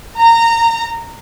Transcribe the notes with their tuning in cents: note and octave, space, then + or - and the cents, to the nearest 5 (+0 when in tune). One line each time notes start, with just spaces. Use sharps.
A#5 -20